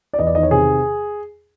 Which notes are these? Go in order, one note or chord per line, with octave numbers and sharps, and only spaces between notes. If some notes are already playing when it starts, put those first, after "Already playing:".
D5
E2 D#5
D5
D#3 D#5
C#5
C3 G#4